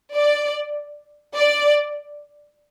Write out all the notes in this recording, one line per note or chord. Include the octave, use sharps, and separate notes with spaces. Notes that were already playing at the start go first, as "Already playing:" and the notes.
D5
D5